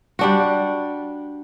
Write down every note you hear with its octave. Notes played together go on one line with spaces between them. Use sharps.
G3 D4 F#4